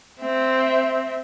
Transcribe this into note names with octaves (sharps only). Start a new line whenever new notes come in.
C4 E5